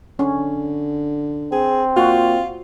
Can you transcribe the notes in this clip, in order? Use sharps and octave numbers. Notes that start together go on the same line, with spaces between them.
D3 C#4
C4 G#4
A#2 F4 F#4